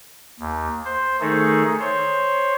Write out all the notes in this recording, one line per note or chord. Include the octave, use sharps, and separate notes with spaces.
D#2
C5
D#3 A3 D#4 G#4 A4
C5 C#5